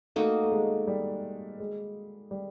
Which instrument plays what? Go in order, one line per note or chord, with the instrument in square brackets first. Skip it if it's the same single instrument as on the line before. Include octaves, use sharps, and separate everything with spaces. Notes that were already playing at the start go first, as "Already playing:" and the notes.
[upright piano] A3 [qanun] A#3 D#4 F#4
[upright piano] A3
G#3
G3
G#3
G3